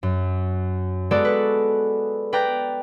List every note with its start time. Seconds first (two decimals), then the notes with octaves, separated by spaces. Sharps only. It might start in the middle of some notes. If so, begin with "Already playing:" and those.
0.03 F#2
1.11 G#3 B3 F#4 A4 D5
1.25 B4
2.33 B4 D5 G5 A#5